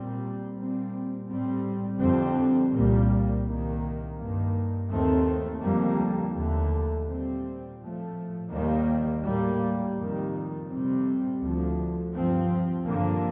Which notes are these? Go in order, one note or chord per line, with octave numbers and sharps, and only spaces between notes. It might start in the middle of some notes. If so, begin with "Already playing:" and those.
Already playing: A#2 G3 C4
A#2 G3 C4
A2 G3 C4
F2 D3 G3 C4
C2 A#2 G3 A#3
C2 C3 D#3 A#3
G2 D#3 A#3
D#2 D#3 A3 C4
F2 D3 G3 A#3
D#2 D3 A3
A#2 G3 C4
A2 F3 A3
D#2 D#3 G3 A#3
A2 G3 A#3
F2 D#3 G3
F2 C3 G3 C4
D2 D3 F3
G2 F3 C4
G2 D3 F3 A#3